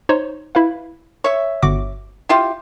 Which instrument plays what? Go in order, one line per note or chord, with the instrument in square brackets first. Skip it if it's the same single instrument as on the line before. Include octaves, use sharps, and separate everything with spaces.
[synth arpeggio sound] D#4 C5 C#5
E4 B4 F5
[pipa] C#5 E5
[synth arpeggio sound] G1 F#4 D6
[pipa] E4 F4 G4